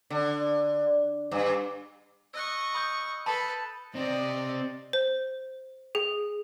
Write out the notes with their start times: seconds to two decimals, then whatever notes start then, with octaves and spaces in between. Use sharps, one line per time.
0.10 D3
1.32 G2
2.34 D#5 C#6 E6 F#6
2.75 B5 D#6 G6
3.26 A4 B4 A5 B5
3.95 C3 C4 D5 D#5
4.93 C5
5.95 G#4